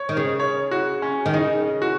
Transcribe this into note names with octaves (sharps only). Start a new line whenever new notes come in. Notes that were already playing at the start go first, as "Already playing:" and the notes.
Already playing: C#5
D#3
C#3
C#5
F#4
C#4
D#3
C#3 D#4
F#4